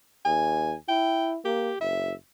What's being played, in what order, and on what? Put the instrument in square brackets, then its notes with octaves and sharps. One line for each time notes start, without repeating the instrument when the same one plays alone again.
[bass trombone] D#2 [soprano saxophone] G#5
[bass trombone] E4 [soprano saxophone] G5
[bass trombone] A#3 [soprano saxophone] G4
[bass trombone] F#1 [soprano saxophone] E5